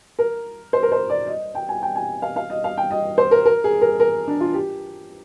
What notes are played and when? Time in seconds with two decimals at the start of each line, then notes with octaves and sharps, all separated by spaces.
0.19 A#4
0.73 C5
0.83 A#4
0.92 C5
1.10 D5
1.27 D#5
1.55 G5
1.69 G#5
1.82 G5
1.96 G#5
2.22 F5
2.36 F5
2.50 D#5
2.64 F5
2.78 G5
2.91 D#5
3.18 C5
3.31 A#4
3.45 A#4
3.64 G#4
3.81 A#4
4.00 A#4
4.28 D4
4.41 F4
4.54 G4